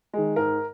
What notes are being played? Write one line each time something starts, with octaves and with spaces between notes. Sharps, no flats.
D#3 G#3
G#2 A#4